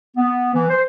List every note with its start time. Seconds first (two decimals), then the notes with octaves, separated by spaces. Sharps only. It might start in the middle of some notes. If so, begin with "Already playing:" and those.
0.17 B3
0.54 E3
0.69 C5